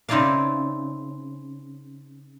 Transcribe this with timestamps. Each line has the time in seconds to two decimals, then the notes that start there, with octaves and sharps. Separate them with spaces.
0.09 C#3 C4 D#4 E4 D5 F5